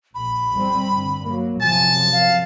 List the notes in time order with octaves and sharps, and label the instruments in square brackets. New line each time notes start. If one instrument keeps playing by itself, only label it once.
[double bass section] A#1 [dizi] B5
[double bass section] F2 G3 C4
G2 D3
F#3 A#3
[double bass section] F#2 C3 F3 [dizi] G#5 [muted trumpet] A5
[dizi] F5